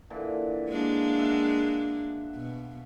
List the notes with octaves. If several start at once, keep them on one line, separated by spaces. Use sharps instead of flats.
A#2 D3 E3
G#3 A#3 D4
E5 F#5
B2